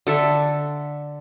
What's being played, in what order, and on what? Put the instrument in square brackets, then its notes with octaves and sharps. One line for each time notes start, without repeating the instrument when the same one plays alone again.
[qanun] D3 A4 E5